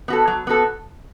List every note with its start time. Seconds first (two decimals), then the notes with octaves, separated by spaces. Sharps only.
0.08 B3 F#4 A4
0.28 F#3
0.47 B3 F#4 A4